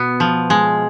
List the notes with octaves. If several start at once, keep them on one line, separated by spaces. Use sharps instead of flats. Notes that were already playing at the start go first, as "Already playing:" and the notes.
Already playing: B2 B3
F3
G#3